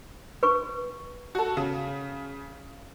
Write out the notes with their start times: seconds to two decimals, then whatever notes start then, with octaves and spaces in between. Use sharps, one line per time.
0.43 B4 C#6
1.35 F#4 A4
1.57 C#3